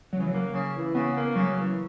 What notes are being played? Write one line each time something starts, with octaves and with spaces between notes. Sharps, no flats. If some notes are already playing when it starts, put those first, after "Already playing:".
C#3 F#3
E3
F#3 A#3
C#3
E3
C#3 B3
A#3
C#3 F#3
E3